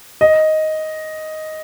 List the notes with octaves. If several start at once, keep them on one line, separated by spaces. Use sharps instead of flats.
D#5